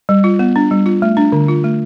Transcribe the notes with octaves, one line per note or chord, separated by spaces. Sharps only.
G3
F4
B3
D4
G3
F4
A3
D4
D3
F4
A3